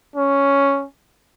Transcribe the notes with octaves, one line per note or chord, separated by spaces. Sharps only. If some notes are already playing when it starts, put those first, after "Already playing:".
C#4